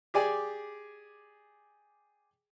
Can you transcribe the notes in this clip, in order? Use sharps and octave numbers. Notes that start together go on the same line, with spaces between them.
G4 G#4 D5 G#5